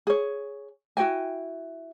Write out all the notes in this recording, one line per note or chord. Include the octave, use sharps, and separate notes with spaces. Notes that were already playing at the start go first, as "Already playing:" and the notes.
G#4 C#5
E4 F#4 G5 G#5